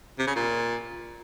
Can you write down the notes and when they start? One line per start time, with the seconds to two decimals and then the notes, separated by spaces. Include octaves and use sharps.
0.19 C3
0.27 C#3
0.36 A#2